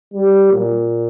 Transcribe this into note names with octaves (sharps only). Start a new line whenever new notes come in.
G3
A#2